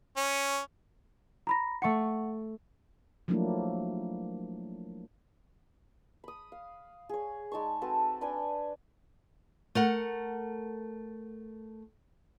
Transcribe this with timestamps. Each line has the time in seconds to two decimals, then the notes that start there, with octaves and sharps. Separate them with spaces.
0.17 C#4
1.47 A#5 B5 A#6
1.82 A3 F#5 C#6 C#7
3.28 F3 F#3 A3 A#3 D4 E4
6.24 B5 D#6
6.52 F5
7.09 G#4 C#5
7.52 G#3 D#4 A5 C#6
7.82 C4 F#4 A4 B4
8.21 D4 B4 G5 G#5
9.75 A3 A#4 F#5